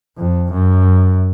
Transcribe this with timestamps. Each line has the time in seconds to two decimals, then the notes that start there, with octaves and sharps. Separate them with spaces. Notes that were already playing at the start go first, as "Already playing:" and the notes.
0.17 F2
0.52 F#2